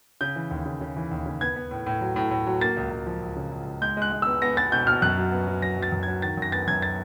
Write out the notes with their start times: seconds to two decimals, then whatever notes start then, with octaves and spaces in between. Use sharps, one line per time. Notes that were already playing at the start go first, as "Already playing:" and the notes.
0.21 C#3 G6
0.36 E3
0.51 D#2
0.66 C#3
0.81 C#3
0.96 E3
1.11 D#2
1.26 C#3
1.41 B3 G#6
1.56 B3
1.71 A2
1.86 A2
2.01 F#3
2.16 A2
2.31 A2
2.46 F#3
2.61 A#3 A6
2.77 C#2
2.91 C#2
3.07 F3
3.22 C#2
3.37 C#3
3.51 C#2
3.66 C#2
3.81 G#3 G6
3.97 G#3 F#6
4.12 G#3
4.22 B3 E6
4.42 B3 A#6
4.57 B3 A6
4.72 B2 G6
4.87 B2 F6
5.02 F#2 F#6
5.18 F#3
5.32 B3
5.47 F#3
5.62 F#3 A#6
5.77 F#3
5.83 A6
5.92 F#2
6.03 F#3 G#6
6.22 D#3 A6
6.37 F#2 A#6
6.52 B3 A6
6.67 F#2 G#6
6.82 A6